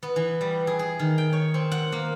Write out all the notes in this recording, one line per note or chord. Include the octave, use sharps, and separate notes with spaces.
B3
E3
G3
G#4
G#4
D#3
G5
C#5
C4
F#5
A#3